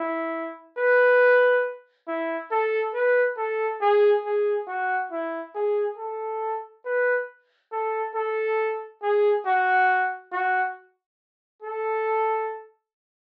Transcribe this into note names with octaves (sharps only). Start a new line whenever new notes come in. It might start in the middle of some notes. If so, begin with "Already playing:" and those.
Already playing: E4
B4
E4
A4
B4
A4
G#4
G#4
F#4
E4
G#4
A4
B4
A4
A4
G#4
F#4
F#4
A4